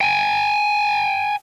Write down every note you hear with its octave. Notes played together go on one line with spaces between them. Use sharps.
G5 G#5